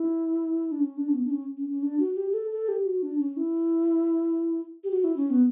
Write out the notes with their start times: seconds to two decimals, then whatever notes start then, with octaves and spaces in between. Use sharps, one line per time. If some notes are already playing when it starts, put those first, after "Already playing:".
Already playing: E4
0.71 D4
0.80 C#4
0.97 D4
1.08 C#4
1.14 B3
1.25 D4
1.31 C#4
1.57 C#4
1.70 C#4
1.82 D4
1.99 F#4
2.17 G4
2.30 G4
2.33 A4
2.51 A4
2.68 G4
2.85 F#4
3.02 D4
3.19 C#4
3.37 E4
4.84 G4
4.91 F#4
5.04 E4
5.16 C#4
5.30 B3